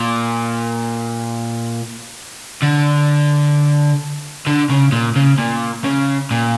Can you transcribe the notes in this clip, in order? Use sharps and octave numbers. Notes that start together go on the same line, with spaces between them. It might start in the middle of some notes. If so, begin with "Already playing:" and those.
Already playing: A#2
D3
D3
C#3
A#2
C#3
A#2
C#3
A#2